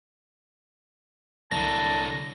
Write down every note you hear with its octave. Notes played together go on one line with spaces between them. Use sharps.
C2 D3 F#3 A5 A#6